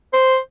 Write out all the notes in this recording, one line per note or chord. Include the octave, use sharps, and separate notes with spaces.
C5